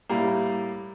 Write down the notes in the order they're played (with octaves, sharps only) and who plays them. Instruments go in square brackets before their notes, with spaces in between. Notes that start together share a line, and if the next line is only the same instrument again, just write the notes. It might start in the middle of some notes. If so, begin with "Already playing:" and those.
[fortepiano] A2 G3 A#3